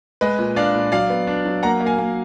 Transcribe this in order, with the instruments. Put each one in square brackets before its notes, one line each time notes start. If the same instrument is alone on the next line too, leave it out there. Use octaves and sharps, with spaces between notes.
[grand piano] G#3 B4 D#5
A#2
D4 D5 F5
A#2
F#3 D5 F5
B3
D4
F#3
A#3 F#5 A#5
A#3
F5 G#5
A#3